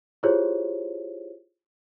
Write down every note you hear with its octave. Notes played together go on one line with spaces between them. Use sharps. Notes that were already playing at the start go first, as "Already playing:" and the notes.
E4 F4 G4 G#4 C5 C#5